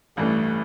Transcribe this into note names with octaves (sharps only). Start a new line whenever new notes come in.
A1 G2 E3 A3